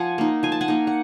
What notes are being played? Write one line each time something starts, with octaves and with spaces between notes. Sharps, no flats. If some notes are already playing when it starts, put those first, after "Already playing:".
Already playing: F3 F#5 G#5
A#3 D#4
F3 G#5
A5
F#5 G#5
A#3 D#4
F#5